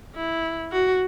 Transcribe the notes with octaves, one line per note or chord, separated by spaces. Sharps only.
E4
F#4